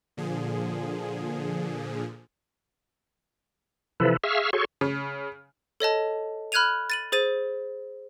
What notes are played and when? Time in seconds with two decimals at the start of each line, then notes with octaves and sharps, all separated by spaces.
0.17 A#2 D3 F3 G#4
4.00 C3 E3 F3 E4 A4 B4
4.24 G#4 E5 F5 C#6 E6 F6
4.53 F#4 G#4 A4 C#5 C6 C#6
4.81 C#3
5.80 A4 C#5 D#5 A5
6.52 B5 F6 F#6 G#6 D#7 F7
6.90 A6 D#7 F#7
7.12 G#4 C5 A6 D#7